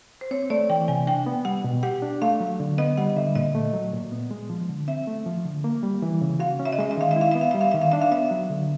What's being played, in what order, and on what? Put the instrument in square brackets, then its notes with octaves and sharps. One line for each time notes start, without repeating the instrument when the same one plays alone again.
[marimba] C5
[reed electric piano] C4 [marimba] C#5
[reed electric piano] A3 [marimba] D5
[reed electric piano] E3 [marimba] G5
[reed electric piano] C3 [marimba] G#5
[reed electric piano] D4 [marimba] G5
[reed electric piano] B3
[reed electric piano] G3 [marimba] F#5
[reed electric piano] B2
[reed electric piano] G4 [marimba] F#5
[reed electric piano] D4
[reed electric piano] A3 [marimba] F5
[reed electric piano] F#3
D3
[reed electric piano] B3 [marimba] D#5
[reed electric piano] G3 [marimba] F#5
[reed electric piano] D3 [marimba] E5
[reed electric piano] A#2 [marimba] D#5
[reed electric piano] A3
F#3
A#2
B3
G#3
F3
D3
[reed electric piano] C4 [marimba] E5
[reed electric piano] A3
F3
D3
A#3
G3
E3
C#3
[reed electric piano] F#4 [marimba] F5
[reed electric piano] C#4
[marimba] E5
D#5
[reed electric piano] G#3 [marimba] E5
[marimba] E5
[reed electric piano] D#3 [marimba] F5
[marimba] E5
[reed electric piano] E4
[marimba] F5
[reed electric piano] B3 [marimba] E5
[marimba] F5
[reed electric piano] G3 [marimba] E5
[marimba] F5
[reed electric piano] D#3 [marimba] E5
[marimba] F5
[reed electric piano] D4 [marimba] E5
[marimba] F5
[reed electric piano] B3 [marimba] E5
[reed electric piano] F#3
D3